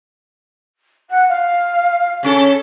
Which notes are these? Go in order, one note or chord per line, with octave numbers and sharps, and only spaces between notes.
F#5
F5
C#3 C#4 A4